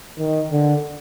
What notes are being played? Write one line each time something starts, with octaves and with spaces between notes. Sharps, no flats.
D#3
D3